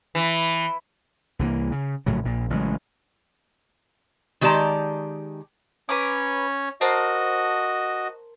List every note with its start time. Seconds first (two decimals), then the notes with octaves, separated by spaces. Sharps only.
0.15 E3
1.39 C2 E3 F#3 A#3
1.72 C#3
2.06 A#1 A2 C#3 F#3
2.24 A#1 A#2
2.50 A1 C#3 F#3 G#3
4.41 D#3 G#3 G4 D5 A5 A#5
5.89 C#4 B4 C#5 A#5 D6
6.81 F#4 A#4 C5 D#5 A5